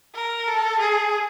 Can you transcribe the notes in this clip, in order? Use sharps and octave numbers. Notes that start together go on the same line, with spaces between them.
A#4
A4
G#4